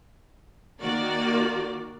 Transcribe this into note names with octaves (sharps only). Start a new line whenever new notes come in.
D#3 A#3 F#4 A#4 D5